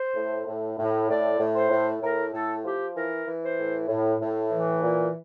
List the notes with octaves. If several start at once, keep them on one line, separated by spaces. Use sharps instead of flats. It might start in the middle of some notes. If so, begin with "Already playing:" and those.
Already playing: C5
A2
A2
A2
A2 D5
A2
C5
A2
A2 A#4
A2 A4
F3 G4
E3 A#4
E3
C5
A2
A2
A2
E3
A#2